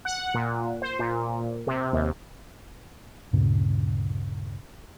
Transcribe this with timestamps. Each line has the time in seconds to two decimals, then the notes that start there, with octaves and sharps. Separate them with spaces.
0.05 F#5
0.34 A#2
0.82 C5
0.99 A#2
1.67 C3
1.93 D#2
3.33 D2 G2 A#2 C#3